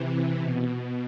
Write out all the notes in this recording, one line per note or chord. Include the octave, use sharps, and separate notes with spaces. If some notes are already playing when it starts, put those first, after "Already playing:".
Already playing: C3 E3
B2